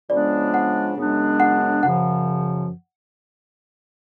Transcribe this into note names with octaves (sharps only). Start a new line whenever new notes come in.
C#3 F3 G#3 B3 D4 D5
F#5
F#2 C#3 G#3 B3 D4
F#5
F#2 C#3 F3 F#5